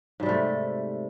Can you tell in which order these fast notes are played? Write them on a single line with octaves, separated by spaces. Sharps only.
G#2 G3 C3 A3